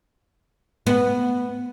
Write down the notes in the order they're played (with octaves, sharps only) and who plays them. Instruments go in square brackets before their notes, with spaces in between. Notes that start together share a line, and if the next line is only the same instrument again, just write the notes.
[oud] B3